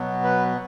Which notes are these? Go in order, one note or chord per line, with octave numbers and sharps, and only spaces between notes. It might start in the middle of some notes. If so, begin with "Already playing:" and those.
Already playing: B2 F#3 B3
B4